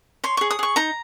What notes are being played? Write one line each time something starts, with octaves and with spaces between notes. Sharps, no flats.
C#5 C6
G#4 C#6
D#6
G#4 C#6
D#4 A#5